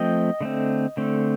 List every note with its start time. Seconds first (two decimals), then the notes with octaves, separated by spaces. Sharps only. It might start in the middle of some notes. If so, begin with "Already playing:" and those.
Already playing: F3 A3 C4 D#5 G5
0.41 D3 A3 C4
0.97 D3 A3 C4